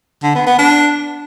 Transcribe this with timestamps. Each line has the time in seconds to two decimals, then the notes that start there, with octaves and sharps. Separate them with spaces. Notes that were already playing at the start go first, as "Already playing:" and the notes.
0.23 D3
0.35 B3
0.47 B3
0.58 D4